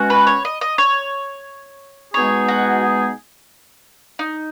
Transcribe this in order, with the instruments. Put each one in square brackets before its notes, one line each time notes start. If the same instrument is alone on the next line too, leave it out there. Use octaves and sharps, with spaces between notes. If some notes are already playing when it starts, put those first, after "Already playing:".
Already playing: [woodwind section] B2 G#3 C#4 F#4
[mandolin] B4
C#5
D#5
D#5
C#5
[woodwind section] B2 G#3 B3 D#4 G#4 [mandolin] C#5
[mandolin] F#4
D#4